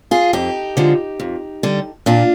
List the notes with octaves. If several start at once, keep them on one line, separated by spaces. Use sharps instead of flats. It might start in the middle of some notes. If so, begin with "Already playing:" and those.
F4 G#4
F2 D#4 G4
D3 F3 G#3
F2
D3 G3
A#2 D4 F4